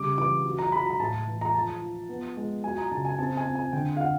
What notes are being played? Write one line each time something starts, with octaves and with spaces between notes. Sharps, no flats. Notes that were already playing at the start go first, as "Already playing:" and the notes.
Already playing: C#3 G3 D6
E3 D6
F#3
A#5
F#3 B5
A#5
A2 A5
E3
A#5
F3 A5
F3
B3
G#3
F#3 G#5
A#5
C#3 A5
G#5
C4 A5
G#5
C4
G#5
D3 G5
F5
F#5